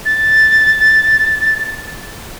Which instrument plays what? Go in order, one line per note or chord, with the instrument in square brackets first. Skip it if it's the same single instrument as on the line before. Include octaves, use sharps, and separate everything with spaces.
[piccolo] A6